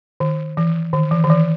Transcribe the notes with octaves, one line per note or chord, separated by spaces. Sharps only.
D#3
E3
D#3
E3
D#3
E3